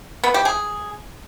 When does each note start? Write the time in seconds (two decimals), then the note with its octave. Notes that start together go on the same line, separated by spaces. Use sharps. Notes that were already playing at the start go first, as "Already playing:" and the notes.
0.24 B3
0.34 G4
0.45 G#4